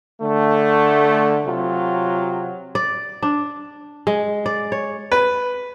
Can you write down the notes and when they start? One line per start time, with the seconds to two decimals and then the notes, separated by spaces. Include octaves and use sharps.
0.21 D3 A3
1.46 C3 F#3 F4
2.75 D5
3.23 D4
4.07 G#3
4.46 D5
4.72 C#5
5.12 B4